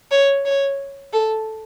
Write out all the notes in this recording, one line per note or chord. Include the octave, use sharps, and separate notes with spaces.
C#5
C#5
A4